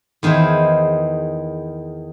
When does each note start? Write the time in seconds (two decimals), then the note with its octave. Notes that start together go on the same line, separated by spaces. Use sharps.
0.23 E2 D#3 E4 G#4 C5